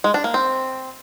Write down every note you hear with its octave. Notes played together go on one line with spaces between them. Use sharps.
G#3
D4
A#3
C4